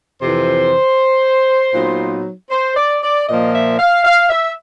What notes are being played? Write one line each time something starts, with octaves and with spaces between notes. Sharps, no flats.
F2 C3 E3 C5
A#2 F#3 B3 D#4
C5
D5
D5
A#2 F3 A#3 D#5
E5
F5
F5
E5